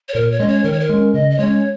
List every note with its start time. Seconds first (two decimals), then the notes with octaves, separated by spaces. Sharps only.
0.09 C#5
0.14 A#2 A#4
0.31 C#5
0.40 G#3 C#4 D#5
0.48 C#5
0.64 D#3 A#4
0.73 C#5
0.80 A#4
0.89 G#3 C#4
1.14 C#3 D#5
1.30 D#5
1.39 G#3 C#4 C#5